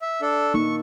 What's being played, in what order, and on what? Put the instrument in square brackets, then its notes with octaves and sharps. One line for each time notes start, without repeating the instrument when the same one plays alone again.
[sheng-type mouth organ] E5
D4 A4
[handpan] A#3 D#4 [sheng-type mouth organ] C#6